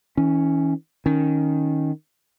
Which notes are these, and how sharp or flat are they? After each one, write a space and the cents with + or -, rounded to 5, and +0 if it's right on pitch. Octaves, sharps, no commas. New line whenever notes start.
E3 -40 C#4 +0
D#3 +0 C#4 +0